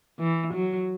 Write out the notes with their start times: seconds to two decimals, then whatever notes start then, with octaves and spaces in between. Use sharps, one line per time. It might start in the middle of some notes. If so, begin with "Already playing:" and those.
0.19 E3
0.53 F#3